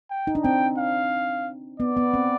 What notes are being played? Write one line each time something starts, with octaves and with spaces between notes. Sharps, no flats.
G5
D#4
D4
C4 G5
F5
B3 D5
B3
C4